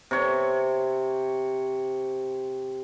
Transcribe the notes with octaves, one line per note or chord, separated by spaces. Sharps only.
C3 C#5